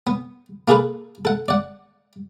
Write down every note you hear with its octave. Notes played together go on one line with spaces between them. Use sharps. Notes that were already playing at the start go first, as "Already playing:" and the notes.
B3
A#3 F4 G#4 A4 B4
A4 F#5
D5 F#5